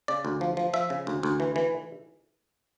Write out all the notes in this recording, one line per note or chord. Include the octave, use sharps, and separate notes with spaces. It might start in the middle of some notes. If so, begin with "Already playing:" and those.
C#3 D5
D2
F3
F3
F3 E5
C#3
D2
D2
E3
E3